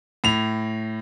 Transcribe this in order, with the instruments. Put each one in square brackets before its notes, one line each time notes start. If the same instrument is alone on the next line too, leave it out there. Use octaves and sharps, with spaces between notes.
[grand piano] A2 F7